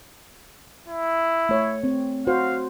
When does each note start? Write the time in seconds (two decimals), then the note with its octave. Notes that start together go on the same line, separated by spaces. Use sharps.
0.88 E4
1.49 A3 C#5
1.84 C4
2.27 F#4 C5 F5